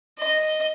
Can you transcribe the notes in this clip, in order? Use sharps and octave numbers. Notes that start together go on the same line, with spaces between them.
D#5